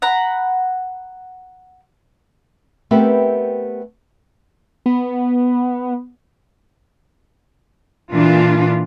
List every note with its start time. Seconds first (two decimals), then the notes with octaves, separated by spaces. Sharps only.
0.02 F#5 A#5 B5
2.91 A3 B3 C4 G4 A#4 B4
4.86 B3
8.13 A#2 E3 D4 F4